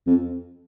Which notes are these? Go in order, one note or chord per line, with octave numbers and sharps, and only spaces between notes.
F2